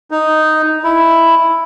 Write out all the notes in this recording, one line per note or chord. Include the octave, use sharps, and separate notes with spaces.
D#4
E4